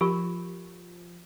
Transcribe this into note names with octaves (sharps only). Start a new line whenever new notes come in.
F3 F4 G4 A#4 C#6